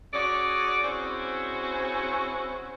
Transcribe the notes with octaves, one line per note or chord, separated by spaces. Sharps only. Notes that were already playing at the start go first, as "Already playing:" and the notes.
C#4 F#4 G#4 D5
C4 C#4 E4 F#4 G#4 C5